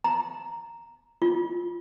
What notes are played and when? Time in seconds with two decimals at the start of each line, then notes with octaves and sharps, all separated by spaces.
0.04 A#5
1.22 F4